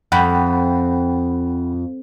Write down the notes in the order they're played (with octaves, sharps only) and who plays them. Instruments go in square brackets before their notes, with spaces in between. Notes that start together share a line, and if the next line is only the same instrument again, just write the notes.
[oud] F2 [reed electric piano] F#5 G5 B5